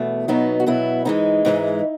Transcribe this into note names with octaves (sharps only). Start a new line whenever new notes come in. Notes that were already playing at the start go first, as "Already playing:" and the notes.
Already playing: E2 B2 A3
B2 F#3 B3 D#4
F#4
B2 F#3 B3 E4
G#2 E3 G#3 D#4
G#2 E3 G#3